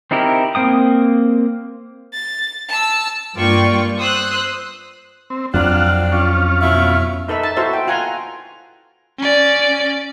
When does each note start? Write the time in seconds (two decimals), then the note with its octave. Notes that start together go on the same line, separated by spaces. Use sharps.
0.11 C4 D#4 E4 G4 A#4
0.55 A#3 C4 G5 D#6
2.12 A6
2.68 A5 E6
3.36 G2 A#3 F4 D5 G5 C#6
3.98 C5 D#6 E6 F#6
5.30 C4
5.54 F2 F#3 C4 D4 F4 F#5
6.12 C#4 F4
6.61 B2 E4 F5
7.28 D#4 A4 B4 E5
7.43 A5
7.57 E4 F#4 A4 C5 E5
7.73 G5
7.87 F4 F#5 G#5 A#5 C6
9.18 C#4 D5